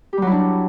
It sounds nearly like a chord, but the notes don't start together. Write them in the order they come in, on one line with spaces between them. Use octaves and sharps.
G4 G3 F#3 E4 D4